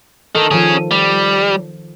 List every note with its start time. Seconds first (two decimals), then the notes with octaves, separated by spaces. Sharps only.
0.35 D#3 A4
0.51 D#3 F3 C#4 G#4
0.91 G3